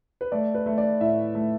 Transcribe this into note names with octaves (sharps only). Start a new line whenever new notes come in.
B4
A3 D5
B4
A3
D5
A2 E5
A3